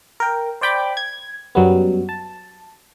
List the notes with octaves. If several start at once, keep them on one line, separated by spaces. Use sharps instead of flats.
A#4 G5
C5 D5 G5 B5 D6
G#6
F#2 F#3 G3 B3
A5